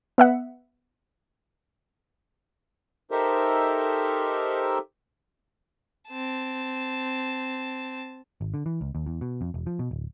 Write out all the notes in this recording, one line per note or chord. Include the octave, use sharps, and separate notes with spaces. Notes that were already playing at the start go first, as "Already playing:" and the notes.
B3 E5 F#5
D#4 G4 A4 A#4 C5 E5
C4 A5
G#1
D3
E3
C#2
D#2
E2
B2
F2
E1
F3
B2
D1